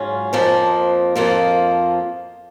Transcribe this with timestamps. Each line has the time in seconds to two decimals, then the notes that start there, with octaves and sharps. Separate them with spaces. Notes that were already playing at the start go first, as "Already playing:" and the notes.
Already playing: G#2 F#3 C#4 F4
0.33 F2 F3 A#3
1.16 F2 F3 A#3